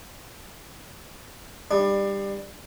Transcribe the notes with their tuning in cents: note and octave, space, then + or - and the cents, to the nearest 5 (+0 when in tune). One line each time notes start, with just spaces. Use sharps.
G3 +15 D4 +25